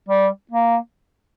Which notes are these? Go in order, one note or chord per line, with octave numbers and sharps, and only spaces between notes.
G3
A#3